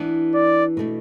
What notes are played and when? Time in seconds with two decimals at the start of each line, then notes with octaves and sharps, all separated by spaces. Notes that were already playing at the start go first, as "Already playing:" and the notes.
Already playing: E3 B3 D4
0.34 D5
0.77 B2 A3 D4